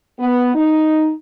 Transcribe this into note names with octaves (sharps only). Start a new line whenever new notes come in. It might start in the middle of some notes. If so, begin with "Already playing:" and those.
B3
D#4